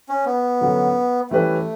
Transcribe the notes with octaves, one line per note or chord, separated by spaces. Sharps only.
C#4
B3
D3 F#3 C#4 F#4
E3 G3 A3 C#4 G4 B4